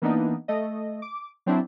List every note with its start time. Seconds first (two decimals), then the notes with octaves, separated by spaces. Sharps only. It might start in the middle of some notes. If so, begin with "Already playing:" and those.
0.02 E3 A#3 B3 D4 D#4
0.48 A3 D#5
1.02 D6
1.46 F#3 C4 D4 E4